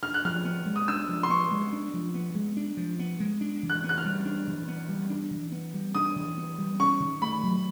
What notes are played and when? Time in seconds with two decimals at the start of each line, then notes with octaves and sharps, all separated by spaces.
0.03 D4 F6
0.14 F#6
0.25 F3 F6
0.45 B3
0.66 G#3
0.76 D#6
0.88 D4 E6
1.09 F3
1.23 C6
1.29 B3 C#6
1.51 G#3
1.73 D4
1.94 F3
2.14 B3
2.35 G#3
2.57 D4
2.77 F3
2.99 B3
3.20 G#3
3.41 D4
3.63 E3
3.70 F#6
3.84 B3
3.89 F#6
3.98 F6
4.05 G3
4.25 D4
4.47 E3
4.68 B3
4.89 G3
5.10 D4
5.31 E3
5.52 B3
5.74 G3
5.95 D4 D#6
6.16 E3
6.38 B3
6.58 G3
6.80 C#4 C#6
7.00 D#3
7.22 A3 B5
7.43 F#3